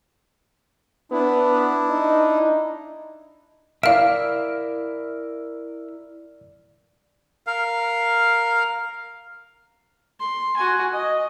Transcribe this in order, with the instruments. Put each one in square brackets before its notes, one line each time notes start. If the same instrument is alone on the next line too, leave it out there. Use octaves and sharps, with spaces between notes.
[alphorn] B3 [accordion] D4 E4
[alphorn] D#4
[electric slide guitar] E4 A#4 E5 [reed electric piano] D5 F6 [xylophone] F5 D7
[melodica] A#4 F5
[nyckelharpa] C6
F#4 G#5
D#5